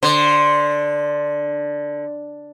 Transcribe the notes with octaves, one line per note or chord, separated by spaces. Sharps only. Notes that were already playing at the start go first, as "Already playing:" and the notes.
D3 C5